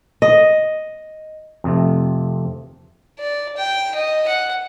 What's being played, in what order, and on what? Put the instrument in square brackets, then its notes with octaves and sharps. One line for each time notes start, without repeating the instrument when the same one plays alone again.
[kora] D#5
[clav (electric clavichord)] F2 C3 A3
[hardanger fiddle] D5
G5
D#5
F#5